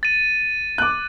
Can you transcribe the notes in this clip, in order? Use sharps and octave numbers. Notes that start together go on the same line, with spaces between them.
A6 D#7
D6 F#6